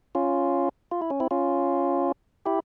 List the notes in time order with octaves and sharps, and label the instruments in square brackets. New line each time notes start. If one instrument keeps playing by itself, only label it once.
[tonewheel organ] C#4 F4
F4
E4
C#4
C4 E4
C#4 F4
E4 G4